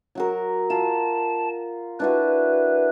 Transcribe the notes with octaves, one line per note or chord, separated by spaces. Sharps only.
F#3 F#4 A#4
F4 A5
D4 E4 F#4 B4